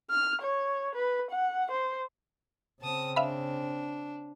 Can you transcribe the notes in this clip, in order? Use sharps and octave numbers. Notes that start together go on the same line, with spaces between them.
F6
C#5
B4
F#5
C5
C#3 C4 A5 D#6
D4 E5 F5 B5